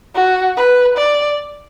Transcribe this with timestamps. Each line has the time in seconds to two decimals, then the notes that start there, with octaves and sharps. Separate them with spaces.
0.16 F#4
0.57 B4
0.97 D5